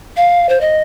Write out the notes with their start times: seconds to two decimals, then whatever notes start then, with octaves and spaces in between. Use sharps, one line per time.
0.17 F5
0.49 C5
0.61 D#5